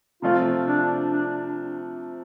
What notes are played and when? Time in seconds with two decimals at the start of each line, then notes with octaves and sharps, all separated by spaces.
0.22 C3 F3 A3 F4
0.67 D4
1.11 D4